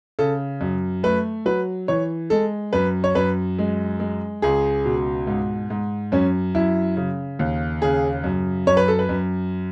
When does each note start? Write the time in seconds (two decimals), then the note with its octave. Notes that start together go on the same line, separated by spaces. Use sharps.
0.19 C#3 A4
0.61 F#2
1.03 A3 B4
1.46 F#3 B4
1.88 E3 C#5
2.30 G#3 A4
2.73 F#2 B4
3.04 C#5
3.15 F#2 B4
3.59 G#3
4.00 G#3
4.42 C#2 G#4
4.85 B2
5.27 G#2
5.70 G#2
6.12 F#2 C#4
6.55 F#2 E4
6.97 C#3
7.39 D#2
7.82 C#3 G#4
8.24 F#2
8.67 F#2 C#5
8.77 B4
8.88 A4
8.99 B4
9.09 F#2